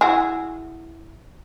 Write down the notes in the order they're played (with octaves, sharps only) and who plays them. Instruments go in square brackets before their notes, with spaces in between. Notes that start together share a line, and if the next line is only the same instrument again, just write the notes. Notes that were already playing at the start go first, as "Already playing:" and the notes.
[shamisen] E4 F#4 G#4